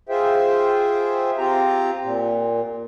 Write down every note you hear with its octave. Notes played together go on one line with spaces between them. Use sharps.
F4 G#4 C5 E5 G5
C4 F4 G4 G5 A#5
A#2